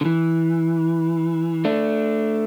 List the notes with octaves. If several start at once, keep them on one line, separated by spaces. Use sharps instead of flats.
D3
E3
A3 D4